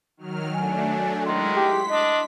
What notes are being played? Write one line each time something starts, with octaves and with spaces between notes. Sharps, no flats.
D#3 F#3 F6
F#3 A3 D4 G#5
D#3 G#3 E4 F#5 C6
G4 B6
D4 D#5